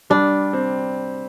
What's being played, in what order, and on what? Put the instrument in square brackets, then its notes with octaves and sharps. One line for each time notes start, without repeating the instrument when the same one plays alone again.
[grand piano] G3 [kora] D4
[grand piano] C4